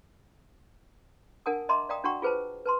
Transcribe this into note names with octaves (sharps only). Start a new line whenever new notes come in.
D4 A#4 F#5 G#5 A5 D#6
D#5 E5 A5 A#5 C6 D6
D5 F5 G5 A#5 D#6
D4 F#4 F#5 G5 A#5 C#6
F4 G#4 B4 C5 A5
B4 A5 C6